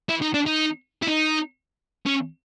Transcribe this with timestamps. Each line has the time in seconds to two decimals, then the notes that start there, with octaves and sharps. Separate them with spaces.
0.09 E4
0.22 D#4
0.34 D4
0.46 D#4
1.02 E4
1.07 D#4
2.06 C#4